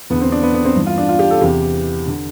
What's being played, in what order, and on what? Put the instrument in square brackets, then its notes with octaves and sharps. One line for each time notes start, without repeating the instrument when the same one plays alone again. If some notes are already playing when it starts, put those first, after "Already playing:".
[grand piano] E2 D3 B3
C4
D4
B3
B3
C4
G2 E3
F4
D4
F4
G4
A4
E2 C3 E3 G4
D3